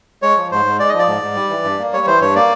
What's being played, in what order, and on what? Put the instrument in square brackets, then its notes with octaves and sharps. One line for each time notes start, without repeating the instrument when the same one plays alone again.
[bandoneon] G#3 C#5
F3
G#2 C5
G#2
G#3 D5
F3 D#5
D5
G#2
G#2
G3
E3
G2
A#3
G3 C#5
E3 C5
G2 C#5
A#3 D5